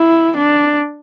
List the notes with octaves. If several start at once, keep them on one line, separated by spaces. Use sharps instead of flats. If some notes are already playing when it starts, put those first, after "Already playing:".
Already playing: E4
D4